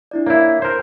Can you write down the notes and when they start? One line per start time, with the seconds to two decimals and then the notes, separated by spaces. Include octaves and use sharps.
0.11 D4 E4 D5
0.27 A#3 E4 C#5
0.62 A#4 C5